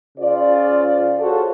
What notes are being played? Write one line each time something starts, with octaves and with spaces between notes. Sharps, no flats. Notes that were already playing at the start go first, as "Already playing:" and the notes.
C#3 F4 C5 D5
F4 F#4 G#4 A4 C5 C#5